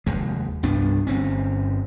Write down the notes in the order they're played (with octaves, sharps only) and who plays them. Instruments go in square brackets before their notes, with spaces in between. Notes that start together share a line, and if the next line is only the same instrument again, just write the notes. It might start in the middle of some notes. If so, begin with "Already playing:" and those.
[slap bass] F1 D#2 G#3
C2 G2 B3 D4
G1 C4 C#4